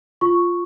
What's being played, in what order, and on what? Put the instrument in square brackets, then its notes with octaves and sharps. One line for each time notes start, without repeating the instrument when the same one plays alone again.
[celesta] F4 C#6